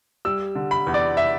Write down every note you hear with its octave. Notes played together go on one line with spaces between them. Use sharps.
G3 E6
D3
B5
E2
D5
E5